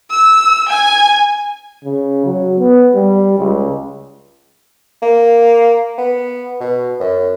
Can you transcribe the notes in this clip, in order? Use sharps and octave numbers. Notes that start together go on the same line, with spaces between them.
E6
G#5
C#3
F#3
B3
G3
C#2
A#3
B3
B2
F#2